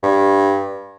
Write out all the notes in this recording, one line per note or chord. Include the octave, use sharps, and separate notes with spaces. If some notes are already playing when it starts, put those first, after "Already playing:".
G2